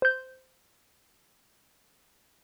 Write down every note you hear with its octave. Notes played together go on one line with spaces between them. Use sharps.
C5 G6